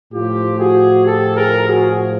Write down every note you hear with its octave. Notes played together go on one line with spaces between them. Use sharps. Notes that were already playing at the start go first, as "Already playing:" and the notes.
A2 F3 F4 G4
F#4 G#4
G4 A4
G#4 A#4
F#4 G#4